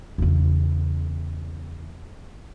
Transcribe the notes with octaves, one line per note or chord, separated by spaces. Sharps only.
E2 C#3